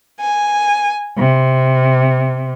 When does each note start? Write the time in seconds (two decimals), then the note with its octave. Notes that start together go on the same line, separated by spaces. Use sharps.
0.22 G#5
1.17 C3